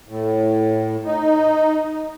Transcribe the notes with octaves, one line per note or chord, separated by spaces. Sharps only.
A2
D#4